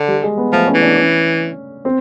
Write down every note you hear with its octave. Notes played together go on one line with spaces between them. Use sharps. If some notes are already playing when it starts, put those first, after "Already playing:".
Already playing: D3
G3
G#3
B3
F3 A3
C#4
E3
D4
C#4
C4